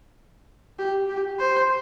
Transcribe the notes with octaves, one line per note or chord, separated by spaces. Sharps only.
G4
G4
C5